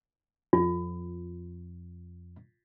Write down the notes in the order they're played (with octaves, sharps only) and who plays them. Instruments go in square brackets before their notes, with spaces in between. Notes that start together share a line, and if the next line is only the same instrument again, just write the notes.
[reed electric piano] F2 [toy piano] F4